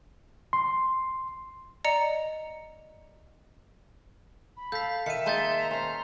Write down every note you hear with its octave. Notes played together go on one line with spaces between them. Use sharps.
C6
D5 D#5 A#5 C#7
B5
A4 F5 G6 B6
D#3 E5 C#7 D#7
A#3 D#4 G#4 A5 C6 G6 A6
A#5
C#4 C5 A#5 C6